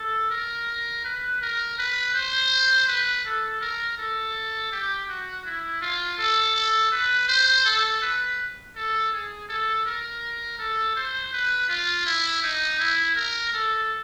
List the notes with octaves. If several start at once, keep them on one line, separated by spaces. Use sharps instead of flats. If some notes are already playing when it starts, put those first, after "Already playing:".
Already playing: A4
A#4
B4
A#4
B4
C5
B4
A4
A#4
A4
G4
F#4
E4
F4
A4
A4
B4
C5
A4
B4
A4
G#4
A4
A#4
A4
C5
B4
F4
E4
D#4
E4
A#4
A4